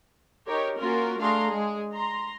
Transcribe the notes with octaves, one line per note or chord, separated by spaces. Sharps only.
D#4 G4 A#4 C#5
A#3 C#4 F4 F#4 A#4
A3 D4 G#4 F5 A#5 C6
G#3 G#4
A#5 C6